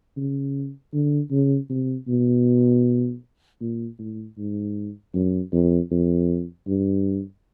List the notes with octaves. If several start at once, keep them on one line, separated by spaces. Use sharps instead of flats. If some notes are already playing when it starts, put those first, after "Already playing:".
C#3
D3
C#3
C3
B2
A#2
A2
G#2
F#2
F2
F2
G2